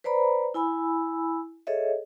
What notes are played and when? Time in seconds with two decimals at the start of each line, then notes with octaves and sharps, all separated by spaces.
0.04 B4 C5 D5 A#5 B5
0.54 E4 G#5 B5 E6
1.67 G#4 A4 C#5 D#5 E5